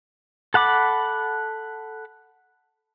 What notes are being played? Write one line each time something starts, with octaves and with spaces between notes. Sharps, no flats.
A4 F#5 B5 D6